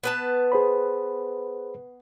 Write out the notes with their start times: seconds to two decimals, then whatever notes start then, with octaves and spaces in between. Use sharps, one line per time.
0.03 B3 B4 A5
0.52 G#4 C5 B5